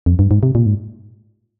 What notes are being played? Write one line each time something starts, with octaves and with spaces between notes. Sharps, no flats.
F2
G2
G#2
C3
A#2
G#2